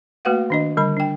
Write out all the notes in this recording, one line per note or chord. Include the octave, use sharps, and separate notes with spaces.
A3 A#3 F#4 B4 F5 F#5
D#3 D4 D#5
D3 G3 B5
D4 G5